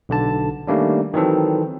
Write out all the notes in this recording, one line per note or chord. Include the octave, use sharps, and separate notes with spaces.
B1 D3 A5
D#3 G3 A3 A#3 C#4 D4
D#3 E3 F#3 C4 A4